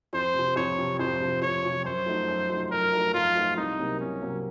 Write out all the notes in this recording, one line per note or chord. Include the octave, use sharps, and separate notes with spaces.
F2 C5
C3 F3
F2 C#5
C3 F3
F2 C5
C3 F3
F2 C#5
C3 F3
F#2 C5
F3 A3 D#4 F#4
F#2
F3 A3 D#4 F#4
F#2 A#4
F3 A3 D#4 F#4
F#2 F4
F3 A3 D#4 F#4
C2 D#4
C3 F#3 A#3
C2 C#4
C3 F#3 A#3